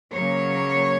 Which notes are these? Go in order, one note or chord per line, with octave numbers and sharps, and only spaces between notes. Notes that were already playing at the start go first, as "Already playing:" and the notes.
C#3 F#3 A#3 C#5